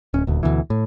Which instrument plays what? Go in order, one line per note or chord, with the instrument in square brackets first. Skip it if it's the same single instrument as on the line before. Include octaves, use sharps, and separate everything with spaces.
[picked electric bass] D1 C#4
D#1 D2
D2 B2 E3
A2